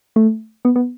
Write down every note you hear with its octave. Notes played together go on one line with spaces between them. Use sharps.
A3
B3
B3